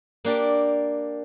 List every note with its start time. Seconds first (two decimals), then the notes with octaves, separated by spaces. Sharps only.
0.25 A#3 D4 G4 D5